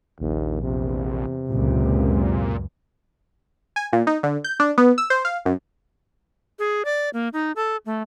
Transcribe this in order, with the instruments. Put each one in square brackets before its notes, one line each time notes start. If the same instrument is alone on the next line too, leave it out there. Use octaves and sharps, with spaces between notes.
[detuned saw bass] A#1 [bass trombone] D#2
[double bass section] E2 [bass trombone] C3
[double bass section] C#2 F#2 [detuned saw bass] A#2
[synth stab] G#5
A#2
D#4
D3
G6
D4
B3
E6
C5
F5
F#2
[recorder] G#4
D5
A#3
D#4
A4
A3